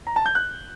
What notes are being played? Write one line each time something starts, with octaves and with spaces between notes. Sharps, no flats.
A#5
A5
G6
F#6